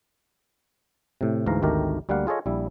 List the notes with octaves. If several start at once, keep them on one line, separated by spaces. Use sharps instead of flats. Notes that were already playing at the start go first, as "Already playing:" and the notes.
A2 C3
D2 G#2 E3 F5 A#5
G#1 D2 D#3 A3 G4 A#4
D2 G3 A#3 F5 F#5
F4 G#4 A4 C#5 D#5
A#1 G3 E4